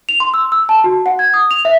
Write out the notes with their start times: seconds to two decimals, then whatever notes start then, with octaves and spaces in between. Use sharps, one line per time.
0.09 F7
0.20 C6
0.34 E6
0.52 E6
0.69 A5
0.84 F#4
1.06 F#5
1.19 G#6
1.34 D#6
1.51 F7
1.65 E5